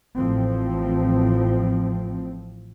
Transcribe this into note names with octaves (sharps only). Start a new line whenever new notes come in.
A1 A2 F3 C4